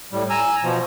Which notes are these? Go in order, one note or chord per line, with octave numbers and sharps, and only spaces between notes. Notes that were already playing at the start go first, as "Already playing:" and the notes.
A2 G3
G#5 A#5 E6
B2 F3